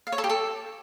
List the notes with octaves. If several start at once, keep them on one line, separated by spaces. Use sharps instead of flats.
F5
C#5
A4
G4
A4